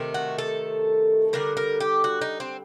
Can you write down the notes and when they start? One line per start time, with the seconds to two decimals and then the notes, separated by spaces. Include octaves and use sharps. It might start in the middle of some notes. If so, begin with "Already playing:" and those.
Already playing: C3 D#3 A3
0.14 F#4
0.38 A4
1.33 D3 G3 A#4
1.57 A#4
1.80 G4
2.04 F#4
2.22 D#4
2.40 C4